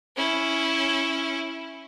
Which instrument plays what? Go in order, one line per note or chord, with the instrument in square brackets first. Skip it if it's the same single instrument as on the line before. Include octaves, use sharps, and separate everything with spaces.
[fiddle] C#4 E4